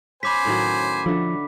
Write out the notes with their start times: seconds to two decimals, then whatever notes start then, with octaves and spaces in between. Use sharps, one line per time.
0.23 C#4 C5 G#5 B5 D6 B6
0.45 A2 D#3 F#3
1.06 D3 F3 A3